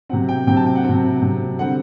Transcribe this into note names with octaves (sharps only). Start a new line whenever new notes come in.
C3 F#3 C4 F#5
G5
C3 F#3 C4 G5
A5
G5
F#5
C3 F#3 C4
C3 F#3 C4
D3 G3 C4 F#5